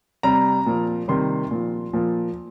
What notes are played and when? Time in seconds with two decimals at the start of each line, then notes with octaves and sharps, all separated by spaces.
0.23 C3 G3 A#5
0.66 A#2 F3
1.08 C3 D#3 G3 C6
1.51 A#2 F3
1.93 A#2 F3